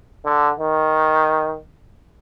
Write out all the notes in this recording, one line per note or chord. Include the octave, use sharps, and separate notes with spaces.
D3
D#3